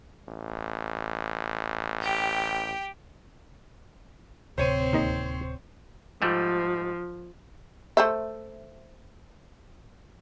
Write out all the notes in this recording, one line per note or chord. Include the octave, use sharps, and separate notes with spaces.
A1
G4 G5
D1 C3 C4 C5 C#5 D#7
D#2 D#3 D#5
G#2 F3 G3 A3
A3 C5 E5